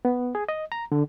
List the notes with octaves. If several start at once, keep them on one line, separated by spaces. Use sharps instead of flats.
B3
G#4
D#5
A#5
D3